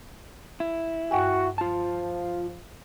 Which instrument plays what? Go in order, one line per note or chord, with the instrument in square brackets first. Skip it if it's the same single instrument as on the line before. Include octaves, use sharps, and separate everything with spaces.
[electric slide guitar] E4
[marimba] G2 G5 G#5 [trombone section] F#4
[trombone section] F3 [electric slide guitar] F4 A5